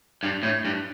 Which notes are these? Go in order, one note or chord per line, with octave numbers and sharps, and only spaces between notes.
G2
A2
G2